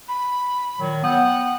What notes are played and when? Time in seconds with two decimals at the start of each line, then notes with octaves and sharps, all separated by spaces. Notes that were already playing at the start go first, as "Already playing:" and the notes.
0.08 B5
0.79 A#2 D#3 F#3
1.03 B3 F#5 G5 D#6